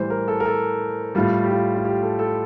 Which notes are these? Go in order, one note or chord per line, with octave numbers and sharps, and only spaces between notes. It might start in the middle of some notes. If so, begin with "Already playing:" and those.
Already playing: A2 E3 G3 C5
A#4
A4
A#4
A4
A2 G3 F4
G4
F4
F4
G4
A4
A4